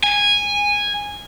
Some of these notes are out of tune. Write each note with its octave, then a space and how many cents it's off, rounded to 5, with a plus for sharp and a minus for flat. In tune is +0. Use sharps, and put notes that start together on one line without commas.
G#5 -10